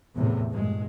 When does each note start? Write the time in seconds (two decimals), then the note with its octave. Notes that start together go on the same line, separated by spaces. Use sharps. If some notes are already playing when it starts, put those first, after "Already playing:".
0.16 E2 A2 C3
0.51 G2 A#2 G#3